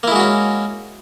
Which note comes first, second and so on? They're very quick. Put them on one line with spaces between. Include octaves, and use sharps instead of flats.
A#3 E4 G#3 F#4 C#4